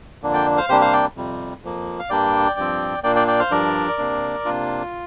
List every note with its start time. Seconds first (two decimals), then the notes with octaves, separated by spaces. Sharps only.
0.22 F2 D3 A#3 D4
0.33 D5 G5
0.57 C5 F5
0.69 C3 G3 A#3 D4 G4 C5
0.81 C5 F5
0.93 D5 G5
1.16 F2 C3 G3
1.63 F2 F3 A#3
1.99 F5
2.10 G2 G3 A#3 D4 D5 G5
2.56 G2 F3 C4
3.03 A#2 A#3 D4 D5 G5
3.16 D5 G5
3.27 D5 G5
3.39 C5 F5
3.51 G2 F3 D4 A#4 D5
3.98 C3 A#3 D4
4.45 C3 A#3 D4 F4